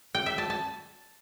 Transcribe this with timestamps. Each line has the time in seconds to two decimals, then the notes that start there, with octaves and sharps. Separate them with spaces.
0.15 G5
0.26 E5
0.38 A5
0.50 A5